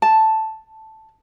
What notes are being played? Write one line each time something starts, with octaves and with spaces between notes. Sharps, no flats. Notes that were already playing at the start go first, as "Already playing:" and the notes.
A5